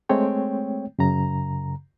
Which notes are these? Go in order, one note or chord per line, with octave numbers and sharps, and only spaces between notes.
G#3 A3 C4 C#5 G5
F#2 C#3 A#5